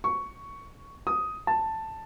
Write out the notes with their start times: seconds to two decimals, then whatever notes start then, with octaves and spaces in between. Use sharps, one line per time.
0.04 C#6
1.07 D#6
1.47 A5